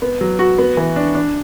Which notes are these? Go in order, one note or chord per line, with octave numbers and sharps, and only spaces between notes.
B3
F#3
F#4
B3
E3
D4
D4